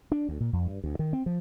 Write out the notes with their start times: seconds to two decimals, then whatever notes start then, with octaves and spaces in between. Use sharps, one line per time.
0.12 D4
0.29 D2
0.40 A#2
0.53 F2
0.66 G2
0.84 D2
0.99 D#3
1.13 C4
1.26 F3